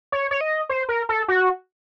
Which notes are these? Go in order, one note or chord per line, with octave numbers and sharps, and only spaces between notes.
C#5
C#5
D#5
C5
A#4
A4
F#4